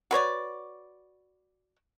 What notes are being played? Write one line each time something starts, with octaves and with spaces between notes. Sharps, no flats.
F#4 B4 C#5 D5